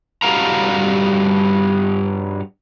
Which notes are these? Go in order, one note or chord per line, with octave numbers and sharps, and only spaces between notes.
G2 G3 F#4 A4 F5 A#5